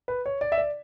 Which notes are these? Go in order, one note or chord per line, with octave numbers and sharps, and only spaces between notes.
B4
C#5
D5
E5
D5